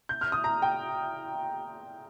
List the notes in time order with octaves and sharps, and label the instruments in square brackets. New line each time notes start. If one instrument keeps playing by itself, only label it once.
[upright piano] G6
F6
D#6
A#5
G5